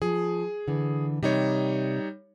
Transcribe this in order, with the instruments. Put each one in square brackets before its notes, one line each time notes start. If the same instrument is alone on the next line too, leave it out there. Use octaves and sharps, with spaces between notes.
[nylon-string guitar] F3 [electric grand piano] G#4
[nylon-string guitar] D3 E3
[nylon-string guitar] C3 A#3 [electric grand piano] G3 D#4 C#5